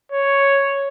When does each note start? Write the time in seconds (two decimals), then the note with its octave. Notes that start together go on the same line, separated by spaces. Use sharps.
0.12 C#5